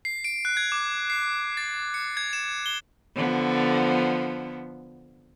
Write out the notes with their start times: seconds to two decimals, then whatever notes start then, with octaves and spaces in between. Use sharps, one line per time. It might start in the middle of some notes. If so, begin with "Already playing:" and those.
0.05 C7
0.24 D7
0.45 F#6
0.57 G#6
0.72 D6
1.10 C7
1.57 A6
1.94 C#7
2.17 G#6
2.33 E7
2.66 G7
3.15 D3 F3 B3